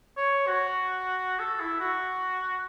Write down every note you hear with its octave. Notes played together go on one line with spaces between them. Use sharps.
C#5
F#4
A4
E4
F#4